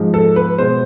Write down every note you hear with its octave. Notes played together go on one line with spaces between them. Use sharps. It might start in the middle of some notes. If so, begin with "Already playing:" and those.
Already playing: G#2 F3 G#3
A4
B4
B2 G#3 C5